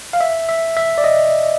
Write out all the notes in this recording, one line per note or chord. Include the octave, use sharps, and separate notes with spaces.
F5
E5
E5
E5
D5
D#5